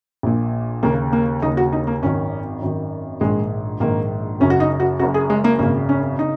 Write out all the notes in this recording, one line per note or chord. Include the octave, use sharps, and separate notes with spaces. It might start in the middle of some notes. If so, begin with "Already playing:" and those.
A#1 A#2
D#2 C#3 A#3
A#3
D#2 C#3 D#4
F#4
D#4
A#3
G#1 F#2 D#3 C#4
G#1 F#2 D#3
A#1 G#2 D#3 G#3
A#1 G#2 D#3 A#3
F#1 F#2 C#3 C#4
F#4
D#4
F#4
F#1 F#2 C#3 F#4
G#4
G#3
A#3
G#1 F#2 C#3 A#3
C#4
C#3 D#4